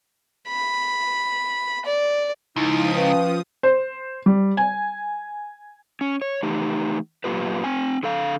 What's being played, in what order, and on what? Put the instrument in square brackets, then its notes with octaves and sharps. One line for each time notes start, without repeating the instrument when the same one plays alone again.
[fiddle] B5
D5
[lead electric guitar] C#2 [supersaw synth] F3 D#6 [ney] D#4 [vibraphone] E4
[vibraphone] C#4 F5 G5 [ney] B4
[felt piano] C5
G3
G#5
[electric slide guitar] C#4
C#5
E3 A3 D#4 G4
F#2 A#2 D#3 F4 G4 B4
C4 G#5
D3 A4 F5